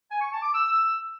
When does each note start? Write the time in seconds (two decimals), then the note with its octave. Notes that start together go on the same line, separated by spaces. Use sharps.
0.09 G#5
0.20 C#6
0.31 A5
0.42 D6
0.53 E6